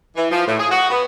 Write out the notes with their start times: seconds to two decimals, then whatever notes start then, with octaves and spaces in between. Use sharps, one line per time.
0.16 E3
0.31 F3
0.47 A2
0.59 G#4
0.71 F#4
0.90 B3